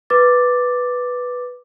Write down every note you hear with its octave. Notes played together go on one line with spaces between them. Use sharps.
B4 D6 A6